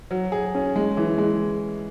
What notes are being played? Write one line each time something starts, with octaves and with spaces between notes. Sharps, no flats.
F#3
G#4
C#4
G#3
E3
G#3